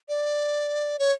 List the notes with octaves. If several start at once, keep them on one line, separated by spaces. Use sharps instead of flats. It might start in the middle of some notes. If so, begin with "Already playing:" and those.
D5
C#5